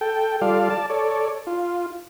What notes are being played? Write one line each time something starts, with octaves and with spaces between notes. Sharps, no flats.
A4 G5
G3 F4 A4 D5 F5
D5 A5
A4 C#5 D5
F4